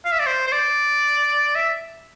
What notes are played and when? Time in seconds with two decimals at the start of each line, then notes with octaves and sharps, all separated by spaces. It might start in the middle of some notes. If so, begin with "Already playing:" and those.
0.05 F5
0.12 E5
0.19 D5
0.27 C5
0.48 C5
0.52 D5
1.55 E5